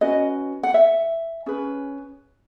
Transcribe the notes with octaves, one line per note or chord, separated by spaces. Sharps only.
C#4 F#4 B4 D#5
F#5
E5
C#4 G#4 B4